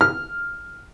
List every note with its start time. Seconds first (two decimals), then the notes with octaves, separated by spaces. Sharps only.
0.01 F6